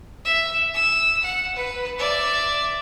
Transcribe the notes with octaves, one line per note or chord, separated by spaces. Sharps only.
E5
E6
F#5
B4
D5 E5